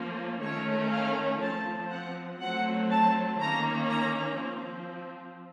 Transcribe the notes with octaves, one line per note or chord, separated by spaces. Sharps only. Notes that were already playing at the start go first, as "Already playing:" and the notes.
Already playing: F3 A#3 C#4
D#3 A3 C#4 C#5
F5
F3 C4 A5
F#5
F#3 A3 C4 F#5
A5
D#3 A#3 C#4 A#5
A#5
F3 C4